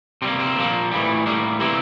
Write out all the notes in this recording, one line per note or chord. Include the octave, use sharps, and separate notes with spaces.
C3 G3 A#3 C4
C4
A#2 F3 A#3
A2 E3 G3
A2 G3 A#3 D4
C3 E3 A#3 C4 E4